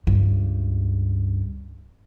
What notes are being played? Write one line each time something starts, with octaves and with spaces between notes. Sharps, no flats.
C#2 G2